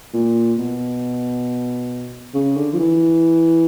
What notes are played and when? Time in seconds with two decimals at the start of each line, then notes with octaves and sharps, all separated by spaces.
0.14 A#2
0.59 B2
2.34 C#3
2.57 D3
2.73 F3
2.79 E3